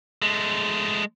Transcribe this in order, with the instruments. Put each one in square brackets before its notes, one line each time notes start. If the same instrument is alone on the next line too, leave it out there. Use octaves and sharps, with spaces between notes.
[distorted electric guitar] G#3 A3